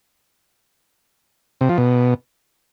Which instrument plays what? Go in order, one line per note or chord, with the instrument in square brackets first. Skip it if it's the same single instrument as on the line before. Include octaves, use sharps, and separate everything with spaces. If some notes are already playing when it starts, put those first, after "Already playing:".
[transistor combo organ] C3
F3
B2